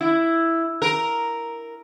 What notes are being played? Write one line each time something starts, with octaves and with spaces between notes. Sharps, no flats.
E4
A#4